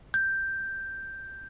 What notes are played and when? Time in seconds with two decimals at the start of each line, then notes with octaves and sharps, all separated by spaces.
0.14 G6